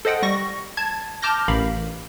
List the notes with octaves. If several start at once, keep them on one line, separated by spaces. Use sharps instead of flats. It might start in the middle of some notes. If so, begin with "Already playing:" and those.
A4 C5 D#5 F#5 G5
G3 C#6 A#6
A5 G#6
A5 D6 F6 G6 A#6
A1 A#4 F5 B5